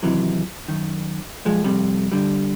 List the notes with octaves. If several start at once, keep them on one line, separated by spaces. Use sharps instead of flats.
D#2 C3 E3 F#3
F#2 D#3
B1 F3 G#3
F2 C3 G3
D3 G3